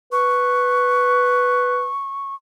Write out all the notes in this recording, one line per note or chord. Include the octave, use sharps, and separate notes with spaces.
B4 C#6